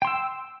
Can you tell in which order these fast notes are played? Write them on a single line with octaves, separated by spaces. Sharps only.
G5 C6 E6